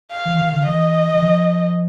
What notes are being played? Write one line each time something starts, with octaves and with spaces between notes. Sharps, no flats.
F5
E3
D#3
D3
E3 D#5
E3
F3